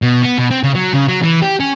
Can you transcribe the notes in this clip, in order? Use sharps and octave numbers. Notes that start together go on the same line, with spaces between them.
B2
B3
B2
C4
C#3
F#3
C#3
F#3
E3
G4
C#4